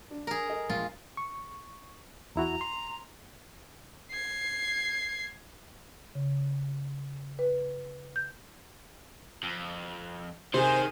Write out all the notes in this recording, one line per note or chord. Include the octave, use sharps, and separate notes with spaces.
D4
G#4 A#4
A4 D#5
A#1 G#3 F4
C#6
E2 E4 F#4 A#5
C6
G#6 C7
C#3
B4
G6
F2
C3 D#3 G#4 C5 G#5